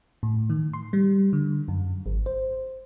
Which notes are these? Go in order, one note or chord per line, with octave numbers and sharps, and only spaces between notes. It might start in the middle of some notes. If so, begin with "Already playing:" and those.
A2
D#3
C6
G3
D3
F#2
G#1
C5